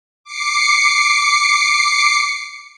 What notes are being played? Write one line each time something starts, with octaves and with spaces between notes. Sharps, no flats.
D6 C7 C#7